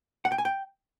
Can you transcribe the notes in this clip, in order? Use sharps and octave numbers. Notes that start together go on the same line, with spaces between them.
F#5
G5
G#5
G5